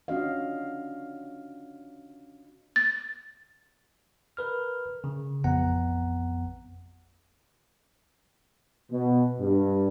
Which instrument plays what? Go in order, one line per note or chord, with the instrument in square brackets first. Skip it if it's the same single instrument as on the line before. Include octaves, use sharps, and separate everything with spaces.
[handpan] C#4 D4 F4 F#4 D#5 F5
[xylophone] A6
[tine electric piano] A#4 B4 F6
C#3
A1 F2 B3 F#5 A#5
[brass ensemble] B2
G2